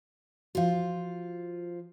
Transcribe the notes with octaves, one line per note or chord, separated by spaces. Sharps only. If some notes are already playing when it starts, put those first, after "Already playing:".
F3 F4 F#4 F5